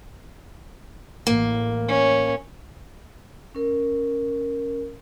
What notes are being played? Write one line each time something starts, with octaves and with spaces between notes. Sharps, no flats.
A1 A#3
C#4
C#4 A#4